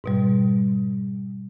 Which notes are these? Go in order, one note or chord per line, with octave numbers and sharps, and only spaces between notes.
G#2 B2 G3